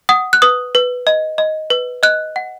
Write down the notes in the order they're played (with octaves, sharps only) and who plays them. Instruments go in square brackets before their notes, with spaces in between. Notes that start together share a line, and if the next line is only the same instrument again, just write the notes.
[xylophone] F#5 D#6
F#6
B4 D#6
B4
D#5
D#5
B4
D#5 F#6
F#5